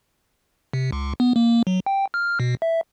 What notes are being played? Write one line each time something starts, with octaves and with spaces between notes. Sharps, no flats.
C3
C#2
B3
A#3
F#3
G5
F6
B2
E5